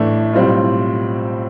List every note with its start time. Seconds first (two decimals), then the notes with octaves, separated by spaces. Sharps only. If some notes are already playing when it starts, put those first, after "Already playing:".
Already playing: A1 A2 E3 A3 D4
0.33 B1 A2 G3 C4 F4